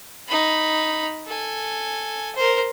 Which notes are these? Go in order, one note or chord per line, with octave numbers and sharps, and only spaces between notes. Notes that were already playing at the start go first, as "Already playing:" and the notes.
D#4 B5
A4 G#5
A#4 C5